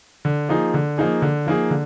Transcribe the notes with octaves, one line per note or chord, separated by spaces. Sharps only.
D3
F3 A#3 D#4 G#4
D3
F3 A#3 D#4 G#4
D3
F3 A#3 D#4 G#4
D3